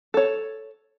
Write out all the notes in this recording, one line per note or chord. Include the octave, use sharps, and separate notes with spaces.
A4 C#5